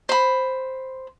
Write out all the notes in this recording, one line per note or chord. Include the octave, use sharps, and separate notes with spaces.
C5 B5